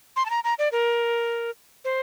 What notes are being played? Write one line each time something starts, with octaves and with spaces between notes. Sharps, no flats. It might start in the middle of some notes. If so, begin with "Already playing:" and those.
C6
A5
A#5
A#5
D5
A#4
C5